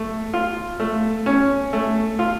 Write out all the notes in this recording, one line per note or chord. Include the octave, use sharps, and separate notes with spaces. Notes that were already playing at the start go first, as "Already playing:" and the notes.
Already playing: A3
F4
A3
C#4
A3
F4